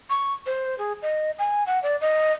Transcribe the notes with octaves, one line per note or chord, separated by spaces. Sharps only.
C#6
C5
G#4
D#5
G#5
F#5
D5
D#5